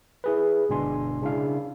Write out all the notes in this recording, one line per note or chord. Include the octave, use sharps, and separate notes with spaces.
E4 G#4 B4
G1 B2 G#3 D4 G#5 C6
C#3 D4 E4 F5